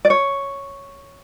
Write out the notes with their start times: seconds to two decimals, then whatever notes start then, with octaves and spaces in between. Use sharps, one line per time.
0.05 D5
0.10 C#5